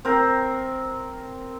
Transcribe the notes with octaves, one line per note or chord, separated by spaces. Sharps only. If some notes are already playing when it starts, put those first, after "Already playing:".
C4 A#4